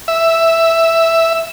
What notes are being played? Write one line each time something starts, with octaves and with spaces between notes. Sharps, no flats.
E5